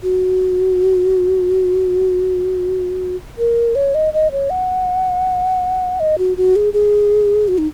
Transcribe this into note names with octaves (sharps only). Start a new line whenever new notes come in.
F#4
A#4
C#5
D#5
D#5
C#5
F#5
D#5
F#4
F#4
G#4
G#4
F#4
D#4